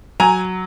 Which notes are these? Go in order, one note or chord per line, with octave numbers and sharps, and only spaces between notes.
F#3 G#5 A#5